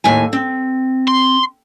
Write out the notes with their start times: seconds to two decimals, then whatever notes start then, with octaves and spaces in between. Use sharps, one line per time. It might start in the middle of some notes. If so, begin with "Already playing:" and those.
0.04 D#2 A2 G#5
0.33 C4
1.08 C6